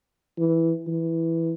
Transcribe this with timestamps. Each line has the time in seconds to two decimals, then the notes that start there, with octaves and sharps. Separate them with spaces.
0.39 E3
0.87 E3